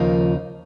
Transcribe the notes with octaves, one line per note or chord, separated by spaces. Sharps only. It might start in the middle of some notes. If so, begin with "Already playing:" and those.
Already playing: D#2 C#3 F3 A#3 D#4